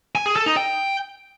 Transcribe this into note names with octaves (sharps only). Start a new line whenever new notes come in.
G#5
G#4
A4
D#4
G5